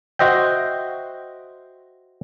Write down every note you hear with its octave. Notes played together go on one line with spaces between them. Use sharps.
F#4 C5 D#5 E5 G5